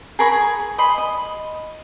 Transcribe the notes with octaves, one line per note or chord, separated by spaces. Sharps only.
G#4 A#4 B5 C#6
G#4
D#5 B5 C6
D#5